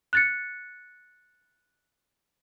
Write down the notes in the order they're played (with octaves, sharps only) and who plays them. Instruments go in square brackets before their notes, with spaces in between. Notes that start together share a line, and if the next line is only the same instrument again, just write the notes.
[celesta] F#6 A6 C#7